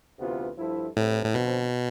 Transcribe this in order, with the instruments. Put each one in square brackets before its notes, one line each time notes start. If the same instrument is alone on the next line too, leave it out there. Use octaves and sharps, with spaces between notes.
[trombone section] D2 C3 E3 B3 F4
G2 F3 A3 E4
[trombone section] C2 C3 E3 A3 E4 [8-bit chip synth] A2
[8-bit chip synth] A2
[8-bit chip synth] B2 [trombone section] D3 F3 C4